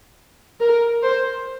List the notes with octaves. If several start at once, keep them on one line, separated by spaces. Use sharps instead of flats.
A#4
C5